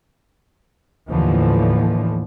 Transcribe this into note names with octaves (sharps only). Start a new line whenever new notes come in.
D#2 A2 D3 E3 F3